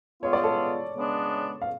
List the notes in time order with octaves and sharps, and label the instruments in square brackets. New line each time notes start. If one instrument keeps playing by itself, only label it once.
[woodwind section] G#3 B3 F4 [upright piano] C#5
[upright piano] D5
A4 C#5
[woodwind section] C#3 G#3 B3 D4
[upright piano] F5